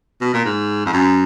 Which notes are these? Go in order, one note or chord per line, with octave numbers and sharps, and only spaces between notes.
B2
A#2
G#2
F2
F#2